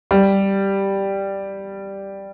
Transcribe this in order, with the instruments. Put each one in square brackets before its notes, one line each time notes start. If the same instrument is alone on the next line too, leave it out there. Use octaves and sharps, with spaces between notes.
[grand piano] G3